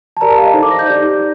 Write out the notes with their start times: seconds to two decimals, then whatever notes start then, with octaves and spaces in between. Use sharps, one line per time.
0.17 A5
0.21 G4 A#4 D5 A#5
0.29 A5
0.38 F5
0.46 D#5
0.54 D#4 A4 C5
0.63 D6
0.71 A#6
0.79 G6
0.87 D#4 G4 D5